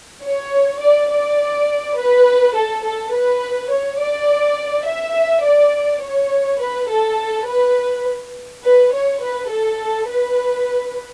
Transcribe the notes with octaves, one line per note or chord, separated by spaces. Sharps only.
C#5
D5
D5
B4
A4
A4
B4
C#5
D5
E5
D5
C#5
B4
A4
B4
B4
C#5
B4
A4
B4